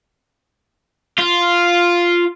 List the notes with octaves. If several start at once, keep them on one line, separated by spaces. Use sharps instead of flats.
F4